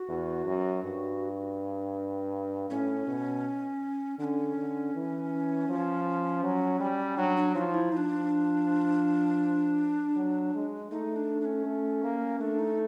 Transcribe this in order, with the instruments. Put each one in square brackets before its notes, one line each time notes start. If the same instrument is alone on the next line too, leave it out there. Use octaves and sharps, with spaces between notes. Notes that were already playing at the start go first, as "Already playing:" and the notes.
Already playing: [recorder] F#4
[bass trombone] E2
F#2
G2
[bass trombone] A2 [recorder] C#4
[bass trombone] B2
[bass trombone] D3 [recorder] D4
[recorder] C#4
[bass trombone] D3
E3
F3
F#3
G3
[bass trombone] F#3 [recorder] D4
[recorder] D4
[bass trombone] F3 [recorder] D#4
[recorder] E4
[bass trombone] F3 [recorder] D4 D#4
[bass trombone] F#3
G#3
[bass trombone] A3 [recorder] D#4
[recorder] D4
D4
C#4
[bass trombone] A3
A#3
[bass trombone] A3 [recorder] D4
[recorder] D#4